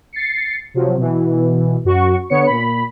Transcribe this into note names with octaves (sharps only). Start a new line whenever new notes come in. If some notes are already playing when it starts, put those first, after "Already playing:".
A6 C7 C#7
C3 F3 F#3
B2 E3
F#2 F#4 C#6
D3 B3 C#5 C#7
A#2 B5